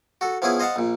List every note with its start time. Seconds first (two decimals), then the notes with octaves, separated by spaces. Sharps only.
0.21 F#4 A4
0.42 F3 B3 C#4 E4 G#4
0.59 C5 D#5 F5 F#5 A5
0.76 A#1 A#2